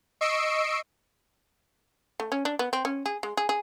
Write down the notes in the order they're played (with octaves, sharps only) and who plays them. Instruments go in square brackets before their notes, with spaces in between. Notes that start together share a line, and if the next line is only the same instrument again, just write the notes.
[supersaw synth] D#5 C#6 E6 C7 D7
[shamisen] A3
C#4
D4
B3
C4
C#4
G#4
G#3
G#4
G#4